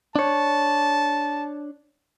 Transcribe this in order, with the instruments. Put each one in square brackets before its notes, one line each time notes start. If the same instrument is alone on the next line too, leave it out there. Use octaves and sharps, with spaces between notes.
[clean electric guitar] D4 C#5 [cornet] A5